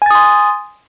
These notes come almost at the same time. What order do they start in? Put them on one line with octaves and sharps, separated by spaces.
G#5 A6 D#6 C6